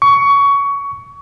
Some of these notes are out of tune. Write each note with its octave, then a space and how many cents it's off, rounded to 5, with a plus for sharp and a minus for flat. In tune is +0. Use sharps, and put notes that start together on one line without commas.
C#6 +20